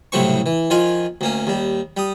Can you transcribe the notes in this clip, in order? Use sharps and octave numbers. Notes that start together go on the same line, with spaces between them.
C2 A2 C#3 F#3 C4 C#6
E3
D#3 F3 F4 G#5
D2 A#3 C#4
D#2 G3
G3 D#6